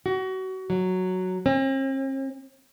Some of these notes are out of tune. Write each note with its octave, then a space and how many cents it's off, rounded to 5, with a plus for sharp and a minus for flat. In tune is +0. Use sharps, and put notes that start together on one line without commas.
F#4 +30
F#3 +0
C4 +45